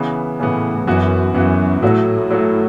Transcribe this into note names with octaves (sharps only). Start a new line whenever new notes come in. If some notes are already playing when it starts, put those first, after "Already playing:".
Already playing: C#3 E3 B3
A2 C#3 E3 B3
F#2 E3 B3 F#4
F#2 E3 B3 F#4
A2 F#3 A3 F#4
F#3 A3 F#4